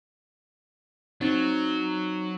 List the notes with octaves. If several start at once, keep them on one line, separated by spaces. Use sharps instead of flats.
F#3 C4 D#4 A6